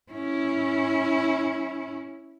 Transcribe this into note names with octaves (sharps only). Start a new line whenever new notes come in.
C#4 E4